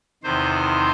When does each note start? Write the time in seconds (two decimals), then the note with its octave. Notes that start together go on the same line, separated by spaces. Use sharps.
0.23 E2 C3 D#3 C5